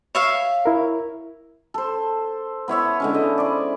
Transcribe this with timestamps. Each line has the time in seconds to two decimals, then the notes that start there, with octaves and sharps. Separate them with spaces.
0.15 C#5 E5 F5
0.66 E4 A#4
1.74 A4 C5
2.68 B3 E4 C#5 E5
3.00 D3 G#3 C#4
3.14 D#5
3.38 E4 C5 D5